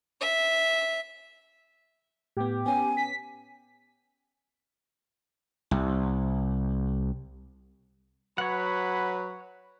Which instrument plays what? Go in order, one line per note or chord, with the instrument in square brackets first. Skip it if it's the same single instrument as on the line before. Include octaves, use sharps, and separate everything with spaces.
[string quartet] E5
[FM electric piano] A2 B3 [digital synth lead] G4
[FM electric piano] B3 C#4 [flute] G#5
[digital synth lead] B6
[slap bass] C2
[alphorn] F#3 [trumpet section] B4 B5 [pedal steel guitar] C#5 F#5